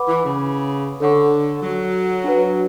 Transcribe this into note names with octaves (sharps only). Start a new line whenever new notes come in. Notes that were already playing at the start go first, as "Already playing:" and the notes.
Already playing: B4 F#5 B5 D6
E3
C#3
D3 A4 C#5 F#5 C#6
F#3
D4 F#4 B4